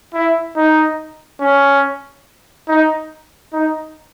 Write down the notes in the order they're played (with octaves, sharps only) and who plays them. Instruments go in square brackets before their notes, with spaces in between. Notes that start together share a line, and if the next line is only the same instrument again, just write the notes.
[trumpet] E4
D#4
C#4
D#4
D#4